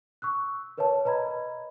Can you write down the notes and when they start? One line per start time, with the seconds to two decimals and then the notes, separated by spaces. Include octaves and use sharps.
0.22 C#6 E6 F#6
0.78 A#4 B4 C#5 E5 A5
1.05 B4 D#5 A#5 B5 G#6